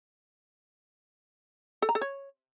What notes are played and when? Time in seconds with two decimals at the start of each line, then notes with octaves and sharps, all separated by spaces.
1.82 A4
1.89 A#5
1.95 A4
2.01 C#5